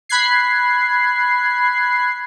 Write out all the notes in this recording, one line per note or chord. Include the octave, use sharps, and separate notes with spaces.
B5 F#6 G#6 C7